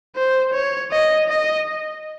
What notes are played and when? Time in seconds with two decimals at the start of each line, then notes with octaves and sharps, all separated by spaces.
0.16 C5
0.53 C#5
0.92 D#5
1.29 D#5